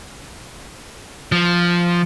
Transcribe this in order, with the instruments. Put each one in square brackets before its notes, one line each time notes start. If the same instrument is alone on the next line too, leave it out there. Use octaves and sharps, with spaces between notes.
[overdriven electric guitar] F3